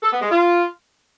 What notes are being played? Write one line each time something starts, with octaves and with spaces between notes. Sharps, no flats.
A4
B3
G#3
F4